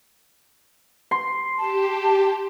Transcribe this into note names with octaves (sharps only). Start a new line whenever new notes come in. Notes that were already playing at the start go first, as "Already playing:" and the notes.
C6
G4 A5